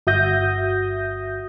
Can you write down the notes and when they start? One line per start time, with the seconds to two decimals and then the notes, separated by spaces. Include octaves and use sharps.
0.07 G1 F#4 E5 D#6 G6 A#6